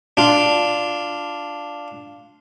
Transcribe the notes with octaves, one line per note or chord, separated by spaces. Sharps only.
D4 F4